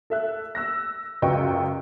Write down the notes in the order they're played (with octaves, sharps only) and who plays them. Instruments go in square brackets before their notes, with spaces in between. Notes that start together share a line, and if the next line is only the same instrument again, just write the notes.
[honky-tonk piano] A4 E5 F#6
E6 F#6 A#6
C#2 F#2 B4 D#5 G5 C#6